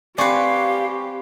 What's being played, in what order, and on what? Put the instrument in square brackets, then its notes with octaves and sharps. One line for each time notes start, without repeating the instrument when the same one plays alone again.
[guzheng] C4 B4 [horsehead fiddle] G4 [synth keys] D5 G#5 C#6 [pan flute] F5